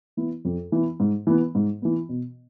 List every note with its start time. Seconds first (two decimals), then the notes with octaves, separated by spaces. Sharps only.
0.17 E3 B3 E4
0.45 F2
0.72 E3 B3 E4
1.00 G#2
1.27 E3 B3
1.55 G#2
1.82 E3 B3
2.09 B2